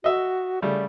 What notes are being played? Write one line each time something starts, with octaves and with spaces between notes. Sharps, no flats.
F#4 D#5 E5
C#3 G3 A3 D5